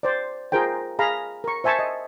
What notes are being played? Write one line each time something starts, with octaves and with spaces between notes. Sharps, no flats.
C5 D5
F4 G#4 A#4 C5 G5
G#4 F5 A#5 B5
A#4 C#6
C5 E5 G#5 A5 C#6
D#5